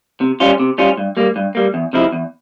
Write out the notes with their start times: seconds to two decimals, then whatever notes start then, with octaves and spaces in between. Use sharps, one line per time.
0.21 C3
0.40 G3 C#4 F4
0.59 C3
0.78 G3 C#4 F4
0.97 G2
1.17 G3 A#3
1.36 G2
1.55 G3 A#3
1.74 E2
1.93 C3 F3 G#3 E4
2.12 E2